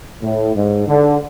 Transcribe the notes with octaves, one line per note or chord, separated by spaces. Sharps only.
A2
G#2
D3